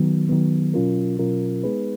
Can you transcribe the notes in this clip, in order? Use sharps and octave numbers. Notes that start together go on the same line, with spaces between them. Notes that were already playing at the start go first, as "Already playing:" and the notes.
Already playing: D#3 F#3 B3
D#3 F#3 B3
B2 F#3 C#4 F4 A#4
B2 F#3 C#4 F4 A#4
G#3 B3 D#4 G#4 B4